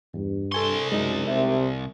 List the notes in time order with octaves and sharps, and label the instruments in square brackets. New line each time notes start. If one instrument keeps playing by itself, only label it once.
[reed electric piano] E2 [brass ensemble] G2
[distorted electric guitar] C2 C6 [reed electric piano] A4 G#5 C#6
[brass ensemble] F#2 [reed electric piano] G#3 D#4
[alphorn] C3 [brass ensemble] A#4 E5